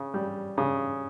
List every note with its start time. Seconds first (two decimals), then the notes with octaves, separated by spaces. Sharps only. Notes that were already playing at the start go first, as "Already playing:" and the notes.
Already playing: C#3
0.14 G3
0.58 C#3